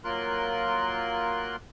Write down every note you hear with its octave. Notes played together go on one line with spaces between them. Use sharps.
F#3 A#3 F4 A#4 C6 F#6